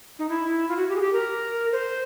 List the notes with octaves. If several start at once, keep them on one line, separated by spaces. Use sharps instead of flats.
D#4
E4
F4
F#4
G4
G#4
G4
A#4
C5